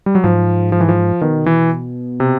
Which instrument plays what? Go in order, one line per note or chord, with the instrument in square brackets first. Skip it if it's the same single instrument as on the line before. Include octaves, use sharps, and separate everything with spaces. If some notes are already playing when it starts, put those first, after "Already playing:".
[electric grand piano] G3
F#3
[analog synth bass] G#2 [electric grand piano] F3
[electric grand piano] F3
E3
F3
[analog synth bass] B2 [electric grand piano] D#3
[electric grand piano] E3
C3